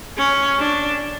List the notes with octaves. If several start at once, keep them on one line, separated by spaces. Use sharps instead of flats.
C#4
D4